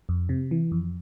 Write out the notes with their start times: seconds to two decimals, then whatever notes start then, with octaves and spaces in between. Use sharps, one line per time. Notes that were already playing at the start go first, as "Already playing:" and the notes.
0.09 F2
0.29 C3
0.51 E3
0.72 F2